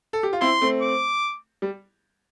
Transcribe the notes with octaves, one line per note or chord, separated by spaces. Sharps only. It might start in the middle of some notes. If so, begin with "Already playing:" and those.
A4
G4
F4
C4 E4 C6
A3 C4
D6
G3